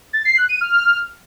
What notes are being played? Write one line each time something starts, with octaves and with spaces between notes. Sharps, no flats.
A6
C7
F#6
D#7
F6